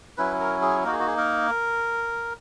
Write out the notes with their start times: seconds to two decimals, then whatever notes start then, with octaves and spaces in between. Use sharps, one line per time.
0.17 F#3 C#4 E4 B4
0.40 A#4
0.62 G#4
0.84 A#3 D#4 F#4 A#4
0.92 G#4
0.99 F#4
1.07 G#4
1.17 A#4